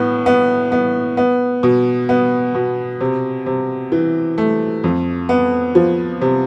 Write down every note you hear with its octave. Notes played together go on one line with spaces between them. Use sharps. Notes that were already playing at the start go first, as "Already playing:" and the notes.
Already playing: A2 B3
B3
B3
B3
B2
B3
B2
C3
C3
E3
A3
F2
B3
F3
C3